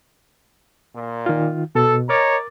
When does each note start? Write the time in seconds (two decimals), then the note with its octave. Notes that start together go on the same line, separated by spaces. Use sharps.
0.95 A#2
1.26 D#3 F4
1.75 B2 A4
2.09 A#4 C#5 D#5 A#5 D6 A6